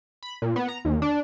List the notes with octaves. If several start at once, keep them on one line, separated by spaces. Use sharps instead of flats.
B5
A#2
B3
A#5
D#2
D4